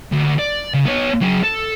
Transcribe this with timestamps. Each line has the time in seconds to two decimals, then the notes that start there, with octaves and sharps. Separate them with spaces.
0.12 D2
0.39 D5
0.74 C#3
0.86 B3 C#5
1.21 F#3 G#4
1.43 A4